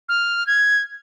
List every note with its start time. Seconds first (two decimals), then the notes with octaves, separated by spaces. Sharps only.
0.09 F6
0.47 G#6